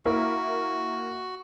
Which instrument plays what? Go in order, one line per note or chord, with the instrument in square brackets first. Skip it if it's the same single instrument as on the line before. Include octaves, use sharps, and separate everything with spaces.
[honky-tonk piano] A#3 E4 A#4 [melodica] F#4